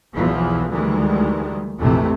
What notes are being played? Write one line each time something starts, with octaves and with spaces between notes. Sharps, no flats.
B1 E2 B2 E3 F3
D2 D#3 E3 G3 G#3
A#1 F2 C3 E3 A3